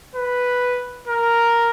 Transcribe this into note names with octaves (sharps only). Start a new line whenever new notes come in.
B4
A#4